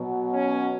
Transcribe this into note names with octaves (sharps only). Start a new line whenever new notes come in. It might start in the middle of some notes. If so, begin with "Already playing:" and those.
Already playing: B2 F#3
C#4